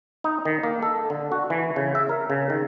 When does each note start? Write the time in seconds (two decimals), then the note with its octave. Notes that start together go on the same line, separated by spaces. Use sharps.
0.24 D#4
0.45 D#3
0.63 A#3
0.82 A4
1.10 D3
1.32 F#4
1.50 E3
1.76 C#3
1.95 E5
2.09 A#4
2.30 C#3
2.50 D#3